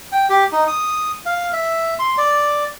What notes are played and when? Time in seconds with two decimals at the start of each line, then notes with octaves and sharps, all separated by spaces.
0.12 G5
0.30 G4
0.52 D#4
0.67 D#6
1.26 F5
1.53 E5
1.99 C6
2.18 D5